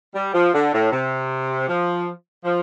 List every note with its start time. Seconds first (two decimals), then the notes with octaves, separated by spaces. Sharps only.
0.15 G3
0.34 F3
0.53 D3
0.73 A2
0.92 C3
1.68 F3
2.44 F3